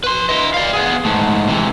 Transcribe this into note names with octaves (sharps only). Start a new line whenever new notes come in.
B4 C6
E4 D#5
D5 F5
B3 G#4
G#2 A3
C3 E3